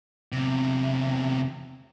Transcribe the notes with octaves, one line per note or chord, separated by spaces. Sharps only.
E2 C3